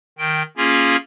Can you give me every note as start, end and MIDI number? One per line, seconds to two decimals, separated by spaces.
0.18 0.43 51
0.18 0.43 79
0.57 0.96 58
0.57 0.96 61
0.57 0.96 65
0.57 0.96 68